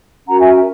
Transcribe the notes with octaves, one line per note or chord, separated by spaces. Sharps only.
C#4 F#4 A#4 F#5 A#5
E5 G#5